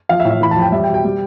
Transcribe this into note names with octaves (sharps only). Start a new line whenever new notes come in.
F3 F5
E5
A2
E5
E3 B5
A5
F2
G5
G3 E5
G5
B2
G5
G3